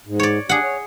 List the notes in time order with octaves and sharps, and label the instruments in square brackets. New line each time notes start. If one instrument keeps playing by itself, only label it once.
[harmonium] G#2
[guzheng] C#5 D5
[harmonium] D4 G4 [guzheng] G#4 F#5
[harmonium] C#5